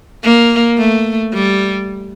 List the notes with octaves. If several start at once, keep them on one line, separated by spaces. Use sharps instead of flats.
A#3
A3
G3